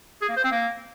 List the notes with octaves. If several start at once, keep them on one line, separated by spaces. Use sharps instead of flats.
G#4
A#3
C5
C4
A#3